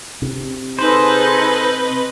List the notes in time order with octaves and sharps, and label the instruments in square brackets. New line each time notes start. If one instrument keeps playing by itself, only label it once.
[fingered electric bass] C3
[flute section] D#4 G#4 A4 [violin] B4 D#5 [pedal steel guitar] C5